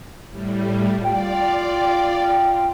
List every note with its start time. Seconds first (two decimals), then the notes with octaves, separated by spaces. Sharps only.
0.29 A2 G3
1.04 F4 D5 G5